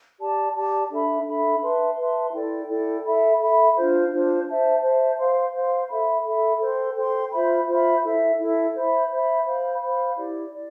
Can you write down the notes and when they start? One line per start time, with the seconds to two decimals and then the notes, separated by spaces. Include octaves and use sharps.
0.19 G4 D5 A5
0.55 G4 D5 A5
0.90 D4 A4 E5 B5
1.26 D4 A4 E5 B5
1.62 B4 E5 A5 C6
1.97 B4 E5 A5 C6
2.33 E4 A4 D5 G5
2.69 E4 A4 D5 G5
3.05 A4 E5 B5
3.40 A4 E5 B5
3.76 D4 F4 C5
4.11 D4 F4 C5
4.47 C5 E5 A5
4.83 C5 E5 A5
5.17 C5 F5 C6
5.54 C5 F5 C6
5.89 A4 E5 B5
6.26 A4 E5 B5
6.61 A4 C5 G5 C6
6.96 A4 C5 G5 C6
7.31 F4 C5 E5 B5
7.67 F4 C5 E5 B5
8.02 E4 A4 E5
8.38 E4 A4 E5
8.74 C5 E5 B5
9.10 C5 E5 B5
9.46 C5 F5 B5
9.81 C5 F5 B5
10.17 E4 G4 D5
10.52 D5